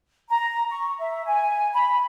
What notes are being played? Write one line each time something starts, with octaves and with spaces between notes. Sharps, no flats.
A#5
C#6
E5
G#5
B5